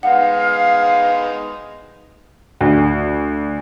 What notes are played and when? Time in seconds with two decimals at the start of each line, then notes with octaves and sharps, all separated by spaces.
0.03 G#3 B3 D#4 F5 F#5
2.61 D2